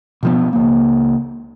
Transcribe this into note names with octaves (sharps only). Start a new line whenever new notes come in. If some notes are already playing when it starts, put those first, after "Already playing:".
B2 F3 B3
C#2 A#3